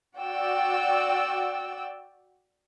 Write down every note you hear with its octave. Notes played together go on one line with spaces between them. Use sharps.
F#4 D5 G5 E6